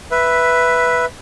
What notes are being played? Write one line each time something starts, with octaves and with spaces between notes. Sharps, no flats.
B4 E5